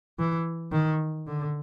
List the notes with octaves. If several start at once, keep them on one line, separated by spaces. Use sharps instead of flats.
E3
D#3
D3